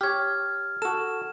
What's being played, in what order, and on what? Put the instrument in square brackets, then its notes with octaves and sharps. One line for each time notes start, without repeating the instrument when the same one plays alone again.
[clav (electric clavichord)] G4 C#5 [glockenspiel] F6 G#6
[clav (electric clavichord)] F#4 A4 [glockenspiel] E7